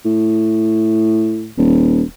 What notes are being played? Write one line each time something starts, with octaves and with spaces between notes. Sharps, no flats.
A2
D#1